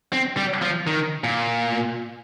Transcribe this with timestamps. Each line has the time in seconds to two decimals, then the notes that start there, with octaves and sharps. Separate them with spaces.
0.13 C4
0.37 G3
0.62 F3
0.87 D#3
1.24 A#2